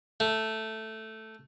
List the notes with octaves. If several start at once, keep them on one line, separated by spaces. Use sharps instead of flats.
A3